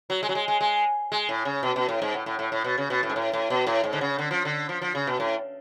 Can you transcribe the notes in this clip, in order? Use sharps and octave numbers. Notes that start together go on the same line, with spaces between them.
F#3
G#3
F#3
G#3
G#3
G#3
G#3
A2
C#3
B2
B2
A2
G#2
A2
A2
A2
A2
B2
C#3
B2
A2
G#2
A2
A2
B2
A2
G#2
D3
C#3
D3
F3
D3
F3
F3
C#3
B2
A2